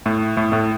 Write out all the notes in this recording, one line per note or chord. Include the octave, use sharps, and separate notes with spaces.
A2 A3
A2 A3
A2 A3